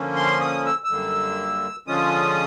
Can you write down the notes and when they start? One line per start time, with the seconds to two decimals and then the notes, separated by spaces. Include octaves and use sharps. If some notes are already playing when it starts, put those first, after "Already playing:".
Already playing: D3 F3 A#3 C#4
0.16 C6
0.41 D#6
0.65 E6
0.84 E6
0.90 F#2 D3 G3 A#3
1.87 D3 F3 G#3 C#4 F4 D#6